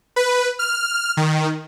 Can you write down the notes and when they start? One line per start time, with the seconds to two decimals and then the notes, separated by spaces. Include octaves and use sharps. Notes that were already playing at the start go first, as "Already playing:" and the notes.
0.16 B4
0.59 F6
1.17 D#3